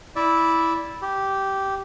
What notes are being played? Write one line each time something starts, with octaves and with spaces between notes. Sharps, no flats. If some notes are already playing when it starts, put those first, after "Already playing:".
E4 D5 E5
G4